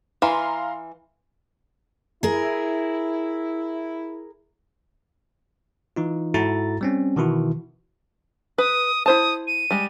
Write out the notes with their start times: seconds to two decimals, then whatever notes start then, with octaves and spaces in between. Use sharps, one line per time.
0.22 E3 F5 A#5 C6
2.23 E4 G#4 A#4
5.96 E3 D#4 F4
6.34 G#2 E4 F#4 A4 A#5 A6
6.81 G3 C4 C#4
7.16 B2 D#3 E3 E4 F#4
8.58 B4 D#6
9.06 E4 C5 A5 D#6
9.47 D#7
9.71 G3 G#3